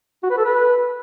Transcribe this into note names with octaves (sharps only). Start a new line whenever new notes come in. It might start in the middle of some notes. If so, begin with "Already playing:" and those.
F#4
B4
A4
B4